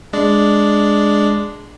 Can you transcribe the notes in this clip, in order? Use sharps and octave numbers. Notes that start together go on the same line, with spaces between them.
G#3 D4 D5